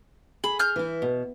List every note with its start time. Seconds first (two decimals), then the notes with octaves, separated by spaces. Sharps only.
0.44 G#4 B5
0.59 F6 G6
0.76 E3 E4
1.02 B2